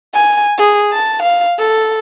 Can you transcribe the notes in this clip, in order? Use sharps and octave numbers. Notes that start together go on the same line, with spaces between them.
G#5
G#4
A5
F5
A4